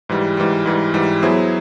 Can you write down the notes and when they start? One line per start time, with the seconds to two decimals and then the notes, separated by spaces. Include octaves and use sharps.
0.09 G#2 E3 G3
0.37 G#2 E3 G3
0.65 G#2 E3 G3
0.94 G#2 E3 G3
1.22 F#3 B3 E4 G#4 C5